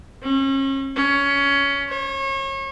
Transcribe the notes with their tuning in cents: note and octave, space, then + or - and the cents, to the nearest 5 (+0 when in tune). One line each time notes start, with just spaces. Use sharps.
C#4 -35
C#4 +15
C#5 -35